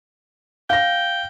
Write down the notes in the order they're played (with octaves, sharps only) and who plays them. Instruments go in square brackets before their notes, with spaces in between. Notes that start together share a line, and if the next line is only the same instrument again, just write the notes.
[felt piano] F5 A#6 [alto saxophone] G5